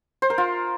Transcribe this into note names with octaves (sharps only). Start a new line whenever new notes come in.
C5
A#4
F4